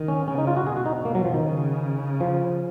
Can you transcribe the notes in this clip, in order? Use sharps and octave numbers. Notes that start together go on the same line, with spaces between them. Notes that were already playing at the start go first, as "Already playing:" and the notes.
Already playing: D#3
C#4
C#3 C#4
D#4
F4
F#4
B2 G#4
F#4
D#4
B2 A#3
F#3
F3
D#3
C#3
F3